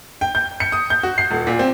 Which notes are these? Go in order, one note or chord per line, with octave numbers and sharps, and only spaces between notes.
G5
G6
C#7
D#6
G6
F#4
C7
D#1
A#2
C4